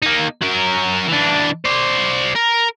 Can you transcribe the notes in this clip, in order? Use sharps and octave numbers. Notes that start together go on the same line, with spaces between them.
A#3 D#4
F#3 A#4
E3 D4
C5 D5
A#4